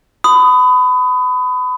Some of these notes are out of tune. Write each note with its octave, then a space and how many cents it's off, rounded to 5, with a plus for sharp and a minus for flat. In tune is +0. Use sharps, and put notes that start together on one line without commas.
B5 +30 D#6 +0